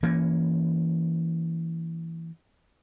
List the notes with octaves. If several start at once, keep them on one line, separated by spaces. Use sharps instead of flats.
E3 A#3 C#4